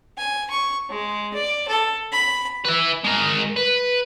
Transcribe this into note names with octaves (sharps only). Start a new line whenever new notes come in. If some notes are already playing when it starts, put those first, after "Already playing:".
G#5
C#6
G#3
D5
A4
B5
B4 E5
G#3 A#4
B4